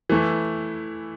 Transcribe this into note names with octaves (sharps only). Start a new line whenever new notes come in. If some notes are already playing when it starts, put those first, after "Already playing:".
E3 A3 E4